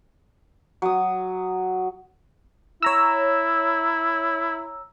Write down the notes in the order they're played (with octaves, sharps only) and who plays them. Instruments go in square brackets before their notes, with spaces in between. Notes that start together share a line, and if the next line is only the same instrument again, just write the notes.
[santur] F#3 D#6
[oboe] E4 [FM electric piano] C#5 A#5 E6